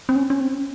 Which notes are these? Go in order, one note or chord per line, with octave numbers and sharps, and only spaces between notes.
C4
C#4
C#4
C4